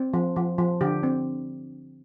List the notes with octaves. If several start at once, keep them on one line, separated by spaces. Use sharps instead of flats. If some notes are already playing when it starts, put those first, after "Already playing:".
Already playing: C4
F3
F3
F3
D3 G4
C4